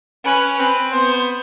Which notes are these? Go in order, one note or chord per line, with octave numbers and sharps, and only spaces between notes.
C#4 B4
C4 B4
B3 C5